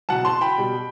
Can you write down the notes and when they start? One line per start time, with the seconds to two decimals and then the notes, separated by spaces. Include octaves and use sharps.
0.09 B2 F#3 F#5 A5
0.25 A5 C6
0.41 G5 B5
0.58 B2 G3